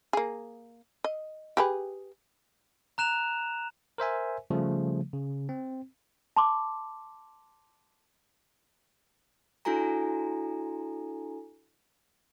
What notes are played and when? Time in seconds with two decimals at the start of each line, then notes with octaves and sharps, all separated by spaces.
0.13 A#3 G#4
1.04 D#5
1.57 G4 G#4 B4
2.98 A#5 F#6 E7 F7
3.98 A#4 C5 E5 G#5
4.50 C#3 F3 G3 A3
5.13 C#3
5.49 C4
6.36 A5 C6 D6
9.65 D4 E4 F#4 A4 G#5 A#5